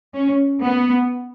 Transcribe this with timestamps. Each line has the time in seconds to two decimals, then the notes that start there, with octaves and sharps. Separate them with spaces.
0.15 C#4
0.63 B3